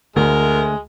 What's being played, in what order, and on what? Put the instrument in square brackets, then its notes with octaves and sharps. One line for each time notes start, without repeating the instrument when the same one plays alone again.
[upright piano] D2 [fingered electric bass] D3 A3 [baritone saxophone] G#3 [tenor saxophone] A#4